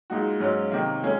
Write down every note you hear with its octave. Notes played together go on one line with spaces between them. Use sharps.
A#2 G#3 D#4 F#4
G#2 F#3 C#4
C3 D#3 A#3
A#2 G#3 C#4 G#4